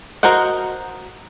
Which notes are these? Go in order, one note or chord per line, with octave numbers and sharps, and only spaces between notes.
F#4 A#4 C5 D#5 F#5